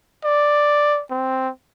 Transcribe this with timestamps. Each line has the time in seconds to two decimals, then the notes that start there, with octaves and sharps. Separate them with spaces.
0.24 D5
1.10 C4